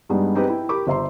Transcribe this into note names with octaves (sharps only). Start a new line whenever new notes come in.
G2 G3 G#3 B3 D#4
C4 D#4 G4 G#4 B4 C5
E4 G5
G4 A#4 B5 D6
G1 C5 E5 A#5 C6